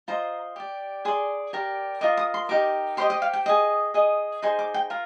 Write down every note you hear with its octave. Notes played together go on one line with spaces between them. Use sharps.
F4 C5 D#5 A#5
G4 D5
G#4 D5 C6
G4 A#4 D5
F4 A#4 D#5 D6
D#6
C6
D#4 G4 A#4 D6
G4 C5 D#5 C6
D#5
F5
G5
G#4 D#5
G#4 D#5
D#4 G#4 C5 C6
D6
G5
F4 A#4